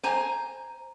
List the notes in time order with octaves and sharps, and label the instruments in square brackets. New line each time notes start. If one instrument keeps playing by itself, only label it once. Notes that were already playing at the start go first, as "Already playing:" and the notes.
[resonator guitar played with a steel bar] C5 G#5 A#5